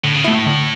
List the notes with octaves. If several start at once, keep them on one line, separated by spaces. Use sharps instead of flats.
A2 D3
C#3
B2 A3 E4
A2
D3